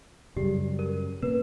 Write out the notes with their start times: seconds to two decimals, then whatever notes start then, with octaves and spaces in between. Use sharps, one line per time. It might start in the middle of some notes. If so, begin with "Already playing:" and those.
0.36 F#2 C#3 G3 G4
0.79 A#4
1.22 B2 A#3 C#4 B4